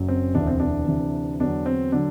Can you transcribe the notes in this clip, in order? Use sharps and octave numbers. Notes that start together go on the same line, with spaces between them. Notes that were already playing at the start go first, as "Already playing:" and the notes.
Already playing: F#1 F#2 F#3
C4
E1 D2 C3 E3 D4
C4
D4
D2 C3 E3
E2 D3 F#3 D4
C4
D3 F#3 D4